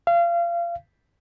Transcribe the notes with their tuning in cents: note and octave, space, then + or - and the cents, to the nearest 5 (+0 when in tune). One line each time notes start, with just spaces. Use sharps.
F5 -30